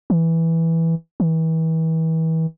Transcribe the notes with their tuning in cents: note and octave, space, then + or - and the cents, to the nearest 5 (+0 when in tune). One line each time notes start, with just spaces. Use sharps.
E3 -5
E3 -35